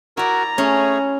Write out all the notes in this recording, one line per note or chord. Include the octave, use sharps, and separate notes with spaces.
E4 F#4 A#4 D5 A#5
A3 C#4 G#4 C#5